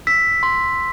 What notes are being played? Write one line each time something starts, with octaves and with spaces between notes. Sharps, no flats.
E6 B6
C6